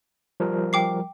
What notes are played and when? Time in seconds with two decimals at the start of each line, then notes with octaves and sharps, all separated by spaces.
0.40 F3 G3 A#4
0.73 G5 D6 C7